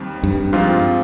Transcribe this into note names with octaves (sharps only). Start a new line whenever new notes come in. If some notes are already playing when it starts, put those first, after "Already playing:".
Already playing: D#2 D#3 G3 C4
G2
G#2 F3 C4 F4